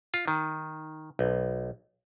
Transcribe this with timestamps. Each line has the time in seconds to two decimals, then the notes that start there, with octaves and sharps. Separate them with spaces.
0.14 F4
0.28 D#3
1.19 B1